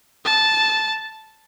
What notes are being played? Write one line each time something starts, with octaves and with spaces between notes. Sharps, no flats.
A5